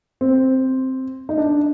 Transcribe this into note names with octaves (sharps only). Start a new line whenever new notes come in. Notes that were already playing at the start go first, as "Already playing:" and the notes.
C4
D#4
D4